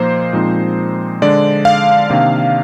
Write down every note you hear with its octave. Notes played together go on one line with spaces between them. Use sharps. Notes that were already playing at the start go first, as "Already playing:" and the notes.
Already playing: A#2 F3 A#3 D#4 C5
A#2 F3 G#3 C4 D#4
D3 G#3 D4 D5
F5
C3 D#3 A#3 D4